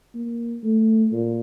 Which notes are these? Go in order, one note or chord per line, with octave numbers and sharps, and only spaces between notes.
A#3
A3
A#2